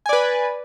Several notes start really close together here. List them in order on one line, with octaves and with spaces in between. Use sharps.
G#5 D5 B4